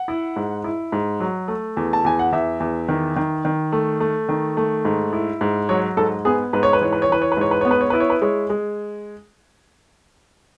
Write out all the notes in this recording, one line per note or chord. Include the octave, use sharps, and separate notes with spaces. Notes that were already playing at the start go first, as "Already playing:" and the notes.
Already playing: F#5
E4
G#2
E4
G#2
F#3
A3
E2
A5
E2 G#5
F#5
E2 E5
E2
D#3
D#3
D#3
A3
A3
D#3
A3
G#2
E4
G#2
F#3 C#5
G#2 A4
B3 G#4
G#2 B4
C#5
B4
E3 C#5
B4
C#5
E3 B4
C#5
B4
G#2 C#5
B4
B3 C#5
B4
C#5
E4 B4
C#5
B4
G#3 C#5
G#3